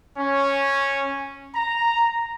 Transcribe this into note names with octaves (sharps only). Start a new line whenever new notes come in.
C#4
A#5